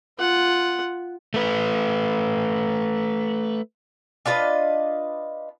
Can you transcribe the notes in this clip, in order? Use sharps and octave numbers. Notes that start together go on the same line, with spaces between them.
F4 F#5
A3 B4
D4 F4 B4 D#5